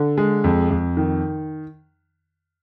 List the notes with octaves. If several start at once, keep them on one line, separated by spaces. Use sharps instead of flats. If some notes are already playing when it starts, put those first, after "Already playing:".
Already playing: D3
G#3
F2
F2
D#3